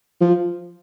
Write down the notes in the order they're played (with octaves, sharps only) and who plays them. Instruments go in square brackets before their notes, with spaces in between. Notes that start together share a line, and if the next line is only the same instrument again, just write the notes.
[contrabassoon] F3